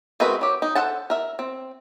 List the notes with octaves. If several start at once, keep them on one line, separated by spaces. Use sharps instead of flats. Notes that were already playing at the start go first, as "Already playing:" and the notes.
G#3 C4 F#4 A#4 B4
F#3 G4
D#4
A4 C5 F#5 A5
A#4 E5
C4